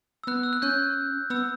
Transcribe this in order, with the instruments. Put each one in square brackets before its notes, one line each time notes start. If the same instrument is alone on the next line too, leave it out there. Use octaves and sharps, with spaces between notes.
[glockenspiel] E6
[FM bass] B3 [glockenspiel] F#6
[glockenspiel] E6
F#6
[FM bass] C#4 [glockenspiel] G6
[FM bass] B3 [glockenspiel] E6